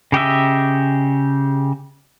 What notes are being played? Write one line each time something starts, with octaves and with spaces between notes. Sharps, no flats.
C#3 G4 D#5 E5